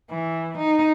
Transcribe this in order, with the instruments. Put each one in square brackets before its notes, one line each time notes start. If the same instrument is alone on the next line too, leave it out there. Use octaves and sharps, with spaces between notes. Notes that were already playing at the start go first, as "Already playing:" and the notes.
[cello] E3
D#4